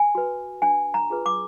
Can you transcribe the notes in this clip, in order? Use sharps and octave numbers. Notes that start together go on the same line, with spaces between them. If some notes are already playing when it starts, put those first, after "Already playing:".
Already playing: G#5
F#4 B4
D4 G#5
A#5
F4 G#4 B4
D6